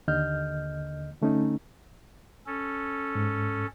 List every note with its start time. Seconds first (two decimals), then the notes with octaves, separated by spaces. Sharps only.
0.08 D#2 D3 D#5 F6 G6
1.21 D3 A3 C#4 D#4
2.46 C#4 A4
3.15 G#2